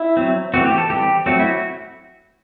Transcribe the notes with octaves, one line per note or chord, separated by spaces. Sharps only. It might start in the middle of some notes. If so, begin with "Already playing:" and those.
Already playing: E4
F#3 C4
E3 A3 C4 F#4
G4
A4
E3 G3 C4 G4
F#3 A3 C4 F#4
E4
F#4